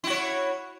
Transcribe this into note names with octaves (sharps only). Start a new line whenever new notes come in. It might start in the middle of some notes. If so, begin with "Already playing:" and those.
E4 F#4 C#5